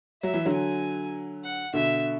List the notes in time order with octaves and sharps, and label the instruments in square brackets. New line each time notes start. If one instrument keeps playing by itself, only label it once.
[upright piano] F#3 [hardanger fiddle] E5
[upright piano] E3
D3 F#3
[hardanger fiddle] G#5
F#5
[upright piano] B2 D3 [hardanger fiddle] E5